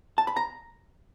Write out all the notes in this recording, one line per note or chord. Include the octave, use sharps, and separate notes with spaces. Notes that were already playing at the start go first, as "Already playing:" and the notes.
A5
B5
A#5